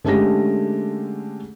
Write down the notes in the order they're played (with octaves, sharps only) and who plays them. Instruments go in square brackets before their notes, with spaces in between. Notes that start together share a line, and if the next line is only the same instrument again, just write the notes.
[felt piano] D3 G#3 A3 C#4 G4 A#6